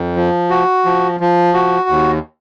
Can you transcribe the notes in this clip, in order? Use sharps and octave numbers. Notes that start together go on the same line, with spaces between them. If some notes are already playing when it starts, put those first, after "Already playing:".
Already playing: F2
F3
F#4
F3
F3
F#4
D#2